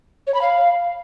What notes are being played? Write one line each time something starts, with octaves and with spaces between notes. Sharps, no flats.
C#5
B5
F5